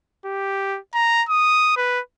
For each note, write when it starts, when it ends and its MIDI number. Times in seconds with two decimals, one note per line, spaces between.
0.25 0.79 67
0.95 1.23 82
1.29 1.74 87
1.77 2.00 71